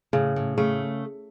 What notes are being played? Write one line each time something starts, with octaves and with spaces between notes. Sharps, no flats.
A2 C#3
A2
C#3 A3